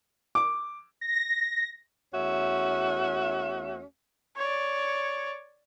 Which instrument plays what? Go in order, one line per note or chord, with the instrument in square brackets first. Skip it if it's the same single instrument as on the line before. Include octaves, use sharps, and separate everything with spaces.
[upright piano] D6
[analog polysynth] A#6
[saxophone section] E2 A3 C#4 F#4 E5
[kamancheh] C#5 D5